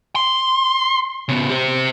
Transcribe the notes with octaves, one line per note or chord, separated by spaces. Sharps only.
C6
C#3 B3
G4 C5